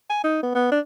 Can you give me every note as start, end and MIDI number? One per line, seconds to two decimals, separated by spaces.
0.10 0.19 80
0.24 0.40 63
0.43 0.54 59
0.55 0.71 59
0.71 0.79 62